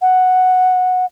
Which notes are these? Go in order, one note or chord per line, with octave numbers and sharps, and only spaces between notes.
F#5